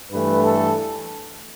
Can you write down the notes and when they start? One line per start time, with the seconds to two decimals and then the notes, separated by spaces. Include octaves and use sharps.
0.12 G2 E3 A3 B4
0.43 A4